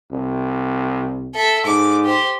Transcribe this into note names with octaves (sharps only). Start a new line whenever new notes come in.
C2
A4 E5
G#2 D6
G4 C5